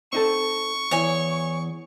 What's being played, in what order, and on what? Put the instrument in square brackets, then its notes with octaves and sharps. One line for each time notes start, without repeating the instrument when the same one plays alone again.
[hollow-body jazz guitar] C4 D#4 A4 [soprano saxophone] C#6
[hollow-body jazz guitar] E2 E3 [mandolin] C#5 G#5